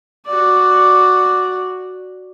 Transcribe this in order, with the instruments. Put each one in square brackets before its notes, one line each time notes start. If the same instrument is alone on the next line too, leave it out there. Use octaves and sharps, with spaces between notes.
[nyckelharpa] F#4 D5